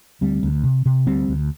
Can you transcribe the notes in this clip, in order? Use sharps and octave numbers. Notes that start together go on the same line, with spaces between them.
D2 G3 C4
D2
C3
C3
D2 G3 C4
D2